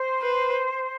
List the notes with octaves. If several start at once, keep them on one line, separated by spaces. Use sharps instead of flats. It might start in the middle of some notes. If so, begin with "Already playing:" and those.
Already playing: C5
B4